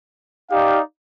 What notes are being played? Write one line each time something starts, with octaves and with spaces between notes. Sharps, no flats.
D#4 G4 D5 F5